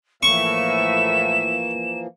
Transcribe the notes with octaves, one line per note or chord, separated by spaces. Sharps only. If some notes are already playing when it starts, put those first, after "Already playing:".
A2 E3 F3 A#3 E5 C#6 E7